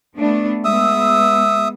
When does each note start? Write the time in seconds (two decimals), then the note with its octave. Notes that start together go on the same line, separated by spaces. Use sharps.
0.18 A3 B3 D4
0.65 G#3 B3 E5 D#6 E6